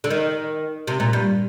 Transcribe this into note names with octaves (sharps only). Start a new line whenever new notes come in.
D3
D#3
C3
A#2
G2